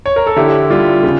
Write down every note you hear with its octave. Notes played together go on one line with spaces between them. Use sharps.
C#5
A#4
A4
D3 E4 G4
G3 F4
C#3